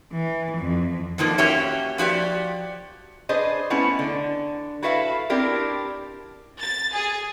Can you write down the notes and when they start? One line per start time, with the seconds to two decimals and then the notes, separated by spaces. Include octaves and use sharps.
0.12 E3
0.57 F2
1.18 D3 D#3 F3 A#3
1.38 A#3 C#4 F#4 G4 C#5 E5
1.98 F3 F#4 G4 D5
3.29 D4 G#4 B4 C5 D#5
3.70 A3 B3 C#4 E4
3.99 D3
4.82 E4 F#4 A4 B4 E5 F5
5.30 C4 D4 E4 G4 A#4
6.60 A6
6.94 G#4